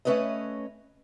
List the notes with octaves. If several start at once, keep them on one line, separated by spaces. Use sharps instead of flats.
A3 C#4 B4 C#5 D#5